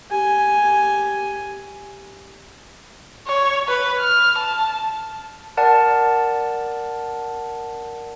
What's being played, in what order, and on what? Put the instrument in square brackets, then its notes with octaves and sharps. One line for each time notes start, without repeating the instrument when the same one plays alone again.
[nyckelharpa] G4 G#5
[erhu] C#5
B4
F6
A5
[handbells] A#4 D5 F#5 A5